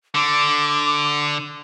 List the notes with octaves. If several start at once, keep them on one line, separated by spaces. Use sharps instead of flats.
D3 D6